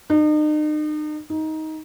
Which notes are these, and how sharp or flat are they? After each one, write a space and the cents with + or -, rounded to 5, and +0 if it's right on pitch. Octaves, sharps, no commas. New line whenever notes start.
D#4 -40
D#4 +15